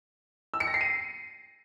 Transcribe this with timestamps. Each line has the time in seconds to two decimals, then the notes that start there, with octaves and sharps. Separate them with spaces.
0.54 E6
0.60 C#7
0.67 A#6
0.74 C7
0.81 D#7